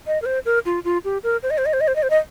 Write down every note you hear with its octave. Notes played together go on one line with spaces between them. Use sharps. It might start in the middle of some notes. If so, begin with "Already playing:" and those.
D#5
A#4
C5
A#4
F4
F4
G4
A#4
C5
D#5
C5
D#5
C5
D#5
C5
D#5
C5
D#5